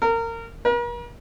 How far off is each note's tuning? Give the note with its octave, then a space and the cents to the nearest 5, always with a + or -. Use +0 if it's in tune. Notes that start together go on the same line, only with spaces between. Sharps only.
A#4 -25
A#4 +45